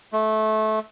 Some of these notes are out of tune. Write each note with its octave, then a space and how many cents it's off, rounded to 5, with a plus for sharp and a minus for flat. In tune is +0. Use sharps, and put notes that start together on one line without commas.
A3 -20